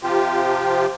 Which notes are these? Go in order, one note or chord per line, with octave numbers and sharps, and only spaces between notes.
C3 F3 F4 G4